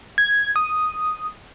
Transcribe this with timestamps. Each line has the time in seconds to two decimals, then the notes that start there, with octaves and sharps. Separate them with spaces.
0.18 G#6
0.56 D#6